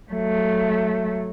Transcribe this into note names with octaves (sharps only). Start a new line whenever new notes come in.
F#3 A3